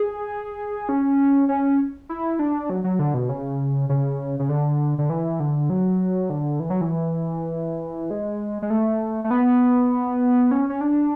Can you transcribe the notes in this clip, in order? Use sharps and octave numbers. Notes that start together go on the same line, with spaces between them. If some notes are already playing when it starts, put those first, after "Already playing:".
Already playing: G#4
C#4
C#4
E4
D4
F#3
F#3
D3
B2
C#3
C#3
C#3
D3
D3
E3
D3
F#3
D3
E3
F#3
E3
G#3
G#3
A3
A3
B3
C#4
C#4
D4